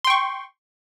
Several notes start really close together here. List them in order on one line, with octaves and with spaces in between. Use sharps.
C6 G5 C#6